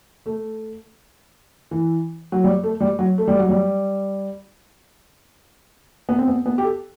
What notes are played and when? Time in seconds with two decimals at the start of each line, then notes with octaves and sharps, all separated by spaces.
0.26 A3
1.71 E3
2.32 F#3
2.44 G3
2.64 A3
2.81 G3
2.99 F#3
3.18 A3
3.28 G3
3.39 F#3
3.49 G3
6.09 B3
6.18 C4
6.28 B3
6.46 B3
6.58 G4
6.64 A4